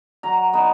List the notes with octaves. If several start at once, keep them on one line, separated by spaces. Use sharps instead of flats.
F#3 A#5
B3 D#4